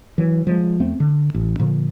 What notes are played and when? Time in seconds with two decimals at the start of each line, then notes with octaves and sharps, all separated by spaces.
0.18 E3 F#3
0.47 F3 G3 G#3
0.80 E2 A3 C4
1.00 D3
1.34 A1
1.59 A#2 D3 F3